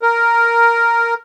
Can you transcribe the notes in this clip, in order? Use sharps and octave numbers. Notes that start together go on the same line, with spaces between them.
A#4